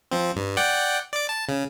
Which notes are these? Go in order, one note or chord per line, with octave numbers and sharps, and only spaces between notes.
F3 C4
G2
D5 F#5 G5
D5 D6
A5
C#3